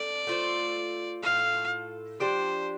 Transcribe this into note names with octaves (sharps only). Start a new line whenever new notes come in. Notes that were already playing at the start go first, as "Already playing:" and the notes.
Already playing: C4 A4 D5
A3 F4 C5
A2 A3 F4 A4 F5
F3 D4 G4 C5 D5